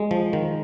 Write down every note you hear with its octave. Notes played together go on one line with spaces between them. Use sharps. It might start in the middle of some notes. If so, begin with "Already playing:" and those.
Already playing: G#3
F3
D#3